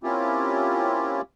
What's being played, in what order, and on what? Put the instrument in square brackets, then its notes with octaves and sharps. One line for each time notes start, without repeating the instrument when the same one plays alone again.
[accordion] A#3 C4 C#4 E4 F4 G4